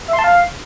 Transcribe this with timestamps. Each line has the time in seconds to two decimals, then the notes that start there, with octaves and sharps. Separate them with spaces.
0.08 E5
0.13 C6
0.19 A5
0.24 F5